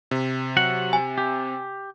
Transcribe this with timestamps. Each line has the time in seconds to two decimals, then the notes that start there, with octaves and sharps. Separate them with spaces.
0.11 C3
0.57 F#3 F#4 F#5
0.93 G#5
1.18 G4